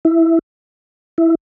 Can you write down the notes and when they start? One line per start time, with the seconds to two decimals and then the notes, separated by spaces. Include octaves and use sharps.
0.05 E4
1.18 E4